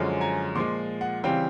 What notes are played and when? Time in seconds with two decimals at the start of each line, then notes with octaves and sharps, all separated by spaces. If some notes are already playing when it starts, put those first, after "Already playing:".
Already playing: F#2 D3 F3 G#3 C#4
0.21 G#5 A#5
0.55 A#2 F3 G#3 C6 D6
1.01 F#5
1.24 C#3 E3 G3 C4 F5 G5